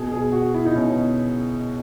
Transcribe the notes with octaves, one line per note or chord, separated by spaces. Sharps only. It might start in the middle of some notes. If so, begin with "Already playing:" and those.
Already playing: B2 G#4
G#4
F#4
E4
D#4
B2 C#4